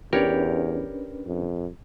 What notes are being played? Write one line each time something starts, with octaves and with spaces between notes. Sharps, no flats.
E2 C#4 D4 G4 A#4 B4 C#5 D5
F2